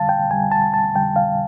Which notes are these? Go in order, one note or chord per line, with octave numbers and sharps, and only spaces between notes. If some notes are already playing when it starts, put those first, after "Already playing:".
Already playing: F2 D3 G3 F5 A5
G5
F2 D3 G3 G#5
A5
A5
F2 D3 G3 G5
F5